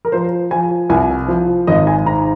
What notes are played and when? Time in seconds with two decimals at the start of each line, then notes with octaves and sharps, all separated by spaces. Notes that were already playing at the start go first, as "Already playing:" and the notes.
0.05 A#4
0.12 F3 C5
0.51 F3 G#5
0.89 C2 G#5
1.28 F3
1.67 G#1 D#5
1.87 G#5
2.06 G#2 A#5